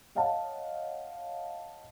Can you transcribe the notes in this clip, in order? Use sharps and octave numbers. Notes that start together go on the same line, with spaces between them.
C#5 D#5 F5 F#5 A5